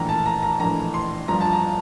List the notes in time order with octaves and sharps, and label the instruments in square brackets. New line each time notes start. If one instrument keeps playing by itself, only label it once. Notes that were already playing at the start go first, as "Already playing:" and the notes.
Already playing: [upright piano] A#1 A2 E3 A#5
A5
A#5
A#5
A#1 A2 E3 A#5
C6
G1 G2 F3 A#5
A5
A#5